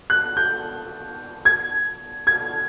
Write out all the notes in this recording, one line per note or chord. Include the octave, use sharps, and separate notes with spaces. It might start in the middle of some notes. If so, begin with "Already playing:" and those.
F#6
G6
G#6
G#6